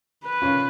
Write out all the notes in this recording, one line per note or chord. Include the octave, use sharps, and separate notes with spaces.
B4
C#4 F4